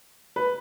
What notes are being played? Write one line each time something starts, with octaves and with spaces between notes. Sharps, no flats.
B4